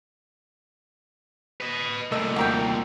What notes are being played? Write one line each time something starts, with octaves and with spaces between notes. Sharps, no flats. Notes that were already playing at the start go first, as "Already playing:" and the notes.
B4 D#5
C2 A#2 A3 D#5 E6
D#2 F#4 A#4 G5